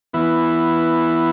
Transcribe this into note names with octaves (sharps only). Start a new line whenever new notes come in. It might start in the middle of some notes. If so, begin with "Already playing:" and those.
E3 B3 E4